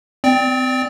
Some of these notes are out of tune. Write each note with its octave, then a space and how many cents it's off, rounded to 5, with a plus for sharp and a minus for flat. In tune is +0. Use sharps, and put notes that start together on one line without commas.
C4 -35 D5 +0 G5 +10